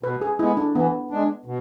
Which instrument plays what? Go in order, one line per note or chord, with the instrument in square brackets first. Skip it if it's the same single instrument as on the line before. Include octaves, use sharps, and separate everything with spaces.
[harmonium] B2 [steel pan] B4
[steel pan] G#4
[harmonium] G#3 B3 [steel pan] E4
[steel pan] D4
[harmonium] E3 [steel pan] B3
[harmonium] G#3 D4
B2